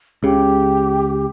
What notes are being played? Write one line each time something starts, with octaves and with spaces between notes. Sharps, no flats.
C#2 C#3 G4